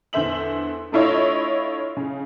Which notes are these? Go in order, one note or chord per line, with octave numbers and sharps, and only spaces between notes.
E2 D3 C5 E5 F#7
A3 D4 E4 F4 C#5 D#5
C#3